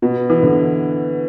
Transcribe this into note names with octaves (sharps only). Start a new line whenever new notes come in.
B2
E3
D3